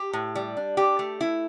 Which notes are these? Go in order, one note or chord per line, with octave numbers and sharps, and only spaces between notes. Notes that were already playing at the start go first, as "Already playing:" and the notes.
Already playing: G4
A2
G3
D4
G4
A3
E4